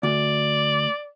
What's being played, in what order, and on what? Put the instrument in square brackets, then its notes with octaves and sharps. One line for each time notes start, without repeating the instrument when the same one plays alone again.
[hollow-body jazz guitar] D2 [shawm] D5